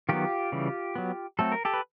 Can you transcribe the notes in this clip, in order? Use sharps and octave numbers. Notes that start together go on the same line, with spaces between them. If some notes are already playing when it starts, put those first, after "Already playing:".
D#3 F#3 B3 F4 G4
C#3 E3 G3
F#3 B3
F#3 A3 C4 A4
A#4
G4 A4
B4